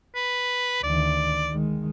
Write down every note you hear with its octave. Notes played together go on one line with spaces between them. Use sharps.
B4
D2 D#3 D5
D#3 G#3